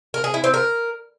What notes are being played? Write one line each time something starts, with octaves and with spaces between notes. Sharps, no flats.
A#4
G#4
E4
C4
A#4